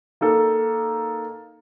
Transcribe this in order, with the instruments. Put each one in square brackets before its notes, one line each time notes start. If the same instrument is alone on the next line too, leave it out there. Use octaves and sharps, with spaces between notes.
[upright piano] A#3 D#4 A4